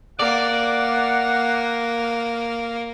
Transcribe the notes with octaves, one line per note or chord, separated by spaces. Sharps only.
A#3 D5 F#5